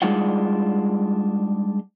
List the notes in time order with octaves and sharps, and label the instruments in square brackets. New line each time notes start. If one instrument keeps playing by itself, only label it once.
[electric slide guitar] G3 G#3 D4 D#4 F4 F#5